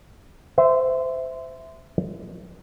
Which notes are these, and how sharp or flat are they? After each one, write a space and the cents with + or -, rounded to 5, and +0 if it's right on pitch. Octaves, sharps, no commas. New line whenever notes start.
C5 -20 E5 +0